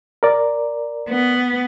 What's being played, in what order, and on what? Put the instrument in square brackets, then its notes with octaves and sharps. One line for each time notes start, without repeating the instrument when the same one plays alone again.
[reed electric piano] A#4 D5
[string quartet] B3